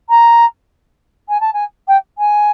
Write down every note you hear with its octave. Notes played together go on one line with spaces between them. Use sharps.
A#5
G#5
A5
G#5
G5
G#5